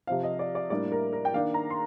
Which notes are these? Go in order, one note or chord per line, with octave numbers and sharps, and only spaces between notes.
C3 F3 C4 F5
D#5
D5
D5
A2 G3 A#3 D4 D5
A#4
A#4
G5
D#3 A#3 D4 F5
A#5
C6